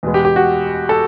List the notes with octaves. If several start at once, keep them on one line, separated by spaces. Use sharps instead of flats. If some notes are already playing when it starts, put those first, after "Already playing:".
E2 B2 G#3 B3
G4
G4
F#4
A4